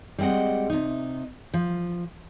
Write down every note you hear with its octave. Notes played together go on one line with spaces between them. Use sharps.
G3 G#3 C4 D#5 F#5
C3 D#4
F3